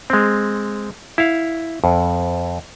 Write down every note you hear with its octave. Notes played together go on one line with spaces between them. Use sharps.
G#3 C4
E4 F5
F2